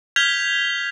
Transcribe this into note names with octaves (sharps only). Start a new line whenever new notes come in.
F6 G6 G#6 B6 F7 G7